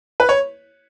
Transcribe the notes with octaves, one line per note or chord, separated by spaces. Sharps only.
B4
C#5